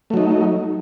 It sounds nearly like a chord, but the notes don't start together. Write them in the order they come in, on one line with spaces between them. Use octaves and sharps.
A3 F#3 D#4